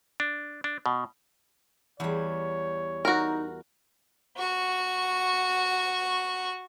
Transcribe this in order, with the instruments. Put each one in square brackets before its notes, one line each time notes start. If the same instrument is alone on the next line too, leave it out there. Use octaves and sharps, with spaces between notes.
[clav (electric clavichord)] D4
D4
B2
[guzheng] E2 G3 [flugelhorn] C#5
[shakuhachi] D#4 [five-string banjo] F#4 A#4
[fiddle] F#4 C#6